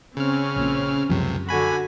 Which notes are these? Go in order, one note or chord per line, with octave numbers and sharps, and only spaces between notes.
C#3 C4 C#4 F6
A#1 A#2
C#2 F#2 C3 F3
D3 F#4 G#5 B5